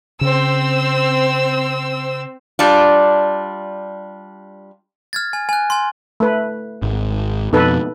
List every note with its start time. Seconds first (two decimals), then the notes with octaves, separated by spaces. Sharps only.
0.21 C#3 C4 C5 E6
2.59 G3 D4 F4
5.13 F6 G#6 A6
5.33 G#5
5.49 G#5 F#6
5.70 G#5 C6
6.20 A3 B4
6.82 G#1
7.53 F2 B2 D#4 A4 B4